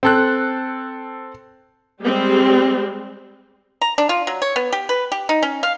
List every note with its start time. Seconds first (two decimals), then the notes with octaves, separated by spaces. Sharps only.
0.03 C4 A4 F#6
2.02 G3 G#3 C4 G4
3.82 A#5
3.98 D4
4.09 F4
4.27 F#3
4.42 C#5
4.56 B3
4.73 G4
4.89 B4
5.12 G4
5.29 D#4
5.42 C#4
5.63 F5